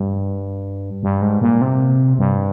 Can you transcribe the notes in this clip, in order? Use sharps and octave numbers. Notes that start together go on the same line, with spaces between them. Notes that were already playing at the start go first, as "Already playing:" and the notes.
Already playing: G2
G2
G#2
A#2
C3
G2